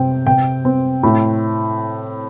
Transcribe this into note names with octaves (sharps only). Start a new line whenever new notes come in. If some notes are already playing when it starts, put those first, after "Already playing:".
Already playing: C3 C4 G5
C3 G5
C4
A2